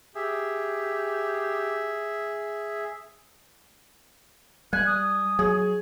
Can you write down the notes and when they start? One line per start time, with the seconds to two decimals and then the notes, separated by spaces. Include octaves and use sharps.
0.15 G4 G#4 E5
4.73 G3 G#5 F#6
4.87 D#6
5.39 F#3 G#4